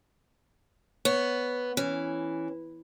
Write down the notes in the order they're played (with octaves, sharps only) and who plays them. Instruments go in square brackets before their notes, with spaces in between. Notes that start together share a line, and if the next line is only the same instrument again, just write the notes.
[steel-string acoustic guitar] B3 [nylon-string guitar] C#5
[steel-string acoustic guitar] E3 [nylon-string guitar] C#4